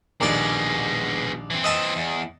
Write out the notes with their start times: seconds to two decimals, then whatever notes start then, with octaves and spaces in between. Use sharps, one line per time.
0.21 A#1 D#2 B2 G#3 D5
1.50 E3 C4
1.64 D#5 E5 A5
1.96 E2